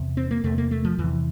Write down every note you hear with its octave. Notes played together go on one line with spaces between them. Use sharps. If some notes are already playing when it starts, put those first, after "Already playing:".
Already playing: E2 C3
C4
A#3
E2 C3 A3
A#3
A3
F3
E2 C3 E3